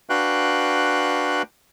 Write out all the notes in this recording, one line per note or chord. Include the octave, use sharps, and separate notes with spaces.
D4 F#4 B4 F5 G5 F#6